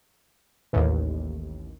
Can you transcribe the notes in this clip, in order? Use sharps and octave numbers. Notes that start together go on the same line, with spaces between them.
A1 D#2